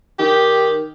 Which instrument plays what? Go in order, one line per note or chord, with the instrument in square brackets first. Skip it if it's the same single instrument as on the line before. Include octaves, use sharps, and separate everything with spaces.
[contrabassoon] D#3 [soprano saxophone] G4